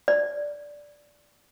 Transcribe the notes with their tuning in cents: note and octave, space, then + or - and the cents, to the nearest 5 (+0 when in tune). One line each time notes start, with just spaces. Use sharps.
D5 -5